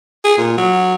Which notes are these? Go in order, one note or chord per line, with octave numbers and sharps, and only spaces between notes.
G#4
A#2
F#3